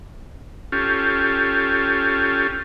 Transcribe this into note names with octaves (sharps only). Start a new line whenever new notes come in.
C#4 F4 G4 A4